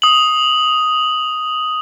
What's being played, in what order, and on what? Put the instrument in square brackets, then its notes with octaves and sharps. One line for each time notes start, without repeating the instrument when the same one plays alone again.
[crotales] D#6 F#7